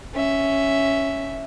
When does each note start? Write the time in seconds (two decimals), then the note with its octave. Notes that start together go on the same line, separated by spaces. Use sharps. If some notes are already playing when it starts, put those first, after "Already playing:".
0.13 C#4 E5